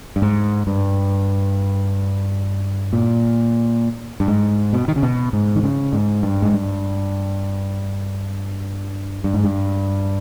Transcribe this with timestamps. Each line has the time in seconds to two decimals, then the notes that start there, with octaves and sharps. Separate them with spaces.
0.16 G2
0.22 G#2
0.67 G2
2.93 A#2
4.20 G2
4.28 G#2
4.73 B2
4.88 D#3
4.96 C#3
5.03 B2
5.33 G#2
5.55 D#3
5.63 C#3
5.93 G#2
6.23 G2
6.42 G#2
6.53 G2
9.24 G2
9.34 G#2
9.44 G2